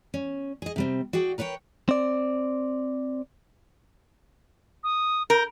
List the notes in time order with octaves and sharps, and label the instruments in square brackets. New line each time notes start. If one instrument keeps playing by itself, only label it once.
[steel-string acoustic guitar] C#4
G#4 D#5
C3 G3 C4
F#4 G#4 D5 G5
A#4 B4 C#5 E5 G5
[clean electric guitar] C4 D5
[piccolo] D#6
[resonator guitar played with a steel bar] A#4 [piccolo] G6